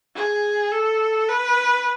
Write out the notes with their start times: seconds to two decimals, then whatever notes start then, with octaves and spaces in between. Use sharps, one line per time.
0.15 G#4
0.72 A4
1.29 B4